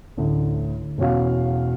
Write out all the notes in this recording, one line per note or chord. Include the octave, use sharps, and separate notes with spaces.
A1 D2 D3
E1 E2 C#4 F#4 F5